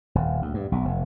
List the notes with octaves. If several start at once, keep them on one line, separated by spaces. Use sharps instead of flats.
D#1
D2
G2
B1
F1